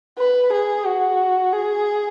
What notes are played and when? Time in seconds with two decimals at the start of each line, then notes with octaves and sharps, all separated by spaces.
0.18 B4
0.52 G#4
0.86 F#4
1.53 G#4